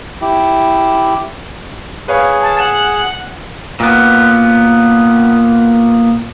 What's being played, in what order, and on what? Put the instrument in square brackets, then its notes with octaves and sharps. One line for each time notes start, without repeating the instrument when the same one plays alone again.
[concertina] E4 G4
[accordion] G#4 [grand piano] B4 C#5 F5
[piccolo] A5
[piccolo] F#5 [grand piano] E7
[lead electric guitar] A#2 B3